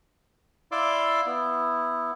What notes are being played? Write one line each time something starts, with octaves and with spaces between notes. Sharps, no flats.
E4 D5 F5 C6 D6 E6
B3 E4